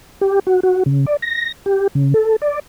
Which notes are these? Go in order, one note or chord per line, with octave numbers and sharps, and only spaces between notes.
G4
F#4
F#4
C#3
D5
A#6
G4
C#3
A4
D5